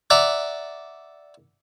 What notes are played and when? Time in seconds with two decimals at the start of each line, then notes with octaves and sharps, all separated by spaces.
0.10 D5 E5 F#5 A#5